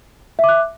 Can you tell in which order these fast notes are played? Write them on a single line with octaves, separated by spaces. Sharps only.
E5 D6 F#6